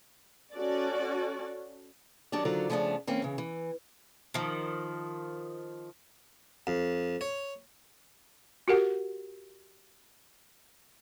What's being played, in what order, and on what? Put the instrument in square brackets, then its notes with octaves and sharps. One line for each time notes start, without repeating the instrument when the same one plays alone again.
[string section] C#4 F#4 A4 D5
[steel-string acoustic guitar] D#3 F#3 D4 G4 A#4 D5
D3 D#3 F#3 F4 C5 D5
C#3 F3 A3 B3 C#4 D4
E3 A#3 C4 C#4
C#3 E3
E3
[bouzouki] D#3 F3
[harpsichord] F2
C#5
[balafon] F#4 G4 A#4 F#5